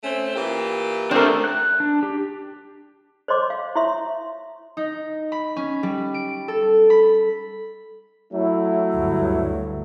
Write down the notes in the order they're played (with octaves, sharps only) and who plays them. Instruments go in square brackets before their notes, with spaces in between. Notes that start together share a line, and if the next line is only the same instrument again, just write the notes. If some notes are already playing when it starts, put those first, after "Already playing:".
[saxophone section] A3 C4 C#4
A#2 E3 G4
[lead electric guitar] A3 D4 [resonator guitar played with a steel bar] C4 A#4
[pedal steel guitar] F#6
D4
G4
[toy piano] C5 C#5 D#5 C6 D6
F5
E4 C#5 E5 C6 C#6
[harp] D#4
B5
C#4
G3
D7
A4
B5
[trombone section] F#3 A3 E4
[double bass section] D2 G2